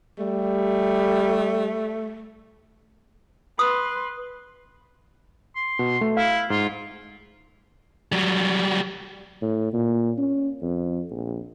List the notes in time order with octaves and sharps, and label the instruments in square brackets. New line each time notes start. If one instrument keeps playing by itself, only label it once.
[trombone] G3 [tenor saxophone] A3
[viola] B4 C6 [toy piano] D#6
[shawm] C6
[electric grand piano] B2
A3
[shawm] E4 [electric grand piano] F5
[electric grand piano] G#2 [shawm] F4
[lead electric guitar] F#3 G3
[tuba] A2
A#2
C#4
F2
A#1